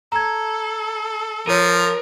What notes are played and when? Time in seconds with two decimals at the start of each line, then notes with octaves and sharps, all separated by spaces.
0.12 A4 A#5 G#6
1.47 F3 A#4 C#5 D#7